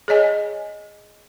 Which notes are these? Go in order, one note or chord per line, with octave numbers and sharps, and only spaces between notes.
G#4 C#5 D#5 G#5